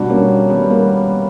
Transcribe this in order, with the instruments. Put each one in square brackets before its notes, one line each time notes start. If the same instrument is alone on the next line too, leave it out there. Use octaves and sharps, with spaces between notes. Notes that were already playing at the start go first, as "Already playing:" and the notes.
Already playing: [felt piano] B2 G3 D4 F#4
A#3 C#4
G3 B3
A#3